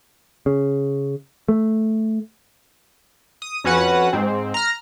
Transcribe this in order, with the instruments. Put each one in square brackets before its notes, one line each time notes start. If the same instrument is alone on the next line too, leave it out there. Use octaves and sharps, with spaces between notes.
[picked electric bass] C#3
A3
[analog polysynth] D#6
F2 C#4 F#4 B4 F#5
G#2 C4
A#5 F6